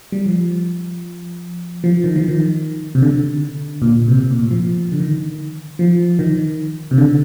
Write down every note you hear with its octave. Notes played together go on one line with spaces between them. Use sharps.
G3
F3
F3
D#3
F3
D#3
C3
D3
A#2
C3
C3
A#2
A2
F3
D3
D#3
F3
D#3
C3
D3